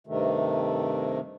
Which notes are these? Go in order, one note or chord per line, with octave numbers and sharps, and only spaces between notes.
G2 C3 D#3 A3